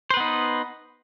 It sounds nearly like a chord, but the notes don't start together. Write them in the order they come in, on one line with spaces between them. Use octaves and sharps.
C5 B4 B3 D#4